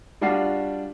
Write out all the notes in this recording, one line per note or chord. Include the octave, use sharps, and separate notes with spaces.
G3 D4 F4 F#4 C7